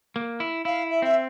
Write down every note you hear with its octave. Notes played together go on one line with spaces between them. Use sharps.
A#3
E4
E4 F5
E5
C4 E5